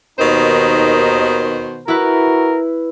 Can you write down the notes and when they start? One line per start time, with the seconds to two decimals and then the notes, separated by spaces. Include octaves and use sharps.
0.19 D#2 B2 D#3 D#4 C5
1.88 E4 F#4 A#4 B4